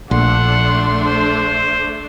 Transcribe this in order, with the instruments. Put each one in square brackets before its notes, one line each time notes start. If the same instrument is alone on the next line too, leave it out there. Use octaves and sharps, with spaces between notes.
[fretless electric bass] A#1 [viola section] A3 D4 [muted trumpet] F#5 [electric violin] C6
[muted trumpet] C5